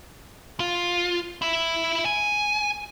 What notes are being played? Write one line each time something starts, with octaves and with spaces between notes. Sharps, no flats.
F4
E4 E5
G#5